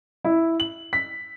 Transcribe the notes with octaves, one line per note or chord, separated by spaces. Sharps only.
E4
F#7
B6